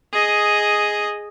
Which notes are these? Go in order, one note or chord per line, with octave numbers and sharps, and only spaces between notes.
G#4 D#5